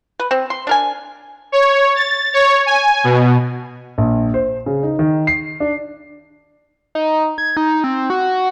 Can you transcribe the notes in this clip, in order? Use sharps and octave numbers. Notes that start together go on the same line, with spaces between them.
B4
C4
C6
D4 A#4 G#5
C#5
A6
C#5
G#5
B2
A#1
C5
C#3
D#4
D#3
C7
D4
D#4
G#6
D#4
C4
F#4